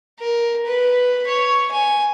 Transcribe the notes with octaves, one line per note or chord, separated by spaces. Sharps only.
A#4
B4
C#5
G#5